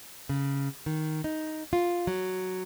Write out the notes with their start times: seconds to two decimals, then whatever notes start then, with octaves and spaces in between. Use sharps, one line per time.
0.29 C#3
0.86 D#3
1.24 D#4
1.73 F4
2.07 F#3